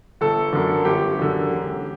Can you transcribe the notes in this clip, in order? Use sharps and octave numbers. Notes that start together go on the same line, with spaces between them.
G1 A4
F#2 D3
G1 G4
F#2 D3
E1